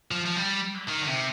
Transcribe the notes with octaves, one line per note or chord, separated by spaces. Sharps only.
F3
F3
G3
D#3
D3
C3